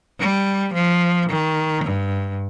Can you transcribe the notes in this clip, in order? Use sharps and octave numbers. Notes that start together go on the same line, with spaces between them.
G3
F3
D#3
G2